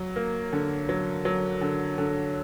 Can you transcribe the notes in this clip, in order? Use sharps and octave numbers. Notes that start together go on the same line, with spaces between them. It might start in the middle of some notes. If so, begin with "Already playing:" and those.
Already playing: F#3
A#3
D3
F#3
F#3
D3
D3